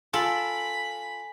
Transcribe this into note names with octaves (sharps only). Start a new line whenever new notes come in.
F4 A4 G#5 B5 F#7